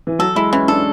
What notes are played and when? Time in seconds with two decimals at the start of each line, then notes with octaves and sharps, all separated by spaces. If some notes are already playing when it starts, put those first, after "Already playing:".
0.07 E3
0.19 F#3 A4
0.36 G#3 E4
0.53 E3 C#4
0.68 D4 A4